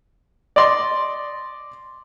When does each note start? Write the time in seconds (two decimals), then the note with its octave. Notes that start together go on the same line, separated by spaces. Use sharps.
0.56 D5 D#5 C6